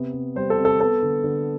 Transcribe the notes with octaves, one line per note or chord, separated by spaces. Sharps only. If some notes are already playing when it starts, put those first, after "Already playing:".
Already playing: C3 B3
C3
G3 C5
A4
C3
A4
B3 A4
D3
D3